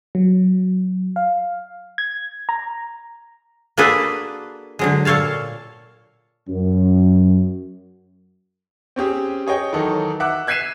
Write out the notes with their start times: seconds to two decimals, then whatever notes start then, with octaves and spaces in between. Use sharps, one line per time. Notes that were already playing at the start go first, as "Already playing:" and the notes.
0.15 F#3
1.16 F5
1.98 G#6
2.49 A#5
3.77 A#3 D4 F#4 G#4 A4 B4
4.79 D3 F#3 G#3
5.05 A#2 A4 C#5 F5 A5
6.48 F#2
8.96 C4 C#4 G4 G#4
9.47 G#4 C#5 D#5 G5
9.73 D#3 E3 F#3 D#4 A4
10.20 E5 F#5 D6 F#6
10.47 F#6 G#6 B6 C7 D#7 E7